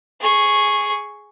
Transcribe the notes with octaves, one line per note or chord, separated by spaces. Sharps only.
G#4 C#6